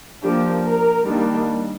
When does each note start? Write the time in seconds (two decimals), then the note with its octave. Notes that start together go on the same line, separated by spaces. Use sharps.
0.23 F3 A#3 D4 G4
0.65 A#4
1.07 D#3 G3 A#3 D4